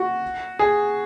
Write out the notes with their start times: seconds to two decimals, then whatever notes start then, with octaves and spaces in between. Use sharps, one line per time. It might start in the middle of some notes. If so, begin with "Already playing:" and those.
Already playing: F#4
0.59 G#4